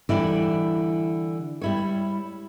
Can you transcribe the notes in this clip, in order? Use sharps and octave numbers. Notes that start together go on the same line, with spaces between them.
D3 E3 G3 E4 D5
G3 E4 C#5